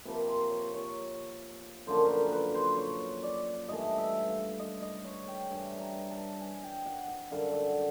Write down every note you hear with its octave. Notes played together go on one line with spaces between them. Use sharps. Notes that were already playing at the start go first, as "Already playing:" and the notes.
C3 F3 A#3 B4
C5
C#5
C#5
F#2 D3 F3 A#3 C5
A#4 B4
B4
C5
C#5
D5
G2 E3 A3 D#5
E5
F5
D#5
D#5
C#5
G5
G2 E3 G3
A#5
A5
G#5
G5
F#5
F#5
F#2 D3 G3 F5
F#5